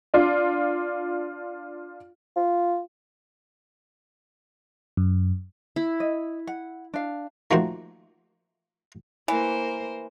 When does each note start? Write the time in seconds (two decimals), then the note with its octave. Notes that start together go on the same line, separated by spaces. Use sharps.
0.14 D4 F4
2.36 F4
4.97 F#2
5.76 E4
6.00 D#5
6.47 F#5
6.94 D4 F5
7.51 D#3 F3 A3 A#3 F#4 C5
9.28 E3 A#3 A#4 C5